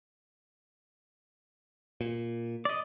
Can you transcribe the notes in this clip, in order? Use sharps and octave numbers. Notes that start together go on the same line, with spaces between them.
A#2
D5 D#5